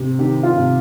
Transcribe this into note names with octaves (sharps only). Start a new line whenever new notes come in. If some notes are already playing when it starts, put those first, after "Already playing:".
Already playing: C3
D#3 G4
F4
C3